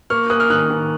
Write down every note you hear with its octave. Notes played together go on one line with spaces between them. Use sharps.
A#3 C#6 F6
A#3 D#6 F#6
F6
D#3 D#6 F#6
D#3